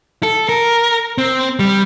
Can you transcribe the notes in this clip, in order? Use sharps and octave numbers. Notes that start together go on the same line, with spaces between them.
A4
A#4
C4
G3